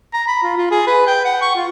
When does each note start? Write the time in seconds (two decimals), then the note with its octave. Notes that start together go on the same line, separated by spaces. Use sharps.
0.14 A#5
0.28 B5
0.43 F4
0.58 F4
0.71 G#4
0.87 B4
1.07 G5
1.25 F#5
1.42 C#6
1.56 F4